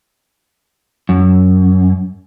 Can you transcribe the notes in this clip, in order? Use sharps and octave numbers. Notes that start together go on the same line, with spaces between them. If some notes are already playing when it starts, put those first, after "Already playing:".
F#2